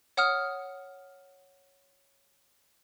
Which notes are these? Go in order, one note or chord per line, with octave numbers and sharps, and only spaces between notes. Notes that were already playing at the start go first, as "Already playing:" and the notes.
C#5 F#5 D#6 F6